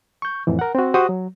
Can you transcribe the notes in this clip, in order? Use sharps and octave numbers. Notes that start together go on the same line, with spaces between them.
C#6 G6
F2 A2 E3
A#4 F#5
C4 F#4
F#4 G4 C5 D#6
F#3